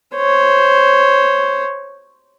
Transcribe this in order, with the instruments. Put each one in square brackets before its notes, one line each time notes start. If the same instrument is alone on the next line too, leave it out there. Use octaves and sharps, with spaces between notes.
[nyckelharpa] C5 C#5